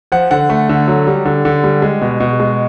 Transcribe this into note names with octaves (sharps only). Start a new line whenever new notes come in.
F3 F#5
D3 F#5
A3
D3
F#3
G3
D3
D3
G3
G#3
B2
B2
G#3